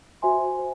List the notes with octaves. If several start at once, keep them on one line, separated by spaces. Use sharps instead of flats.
F#4 C5 E5 G#5 C6
C5